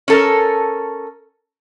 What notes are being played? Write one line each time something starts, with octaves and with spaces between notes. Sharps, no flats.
C#4 A4 A#4